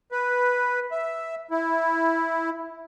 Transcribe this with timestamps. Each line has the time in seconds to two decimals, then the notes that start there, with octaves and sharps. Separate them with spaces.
0.12 B4
0.92 E5
1.51 E4